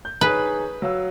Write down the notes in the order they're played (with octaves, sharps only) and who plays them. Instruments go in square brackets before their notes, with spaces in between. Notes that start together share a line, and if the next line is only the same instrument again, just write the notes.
[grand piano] G6
[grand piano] D#4 G#4 C#5 [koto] B4
[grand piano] F#3 F5 E6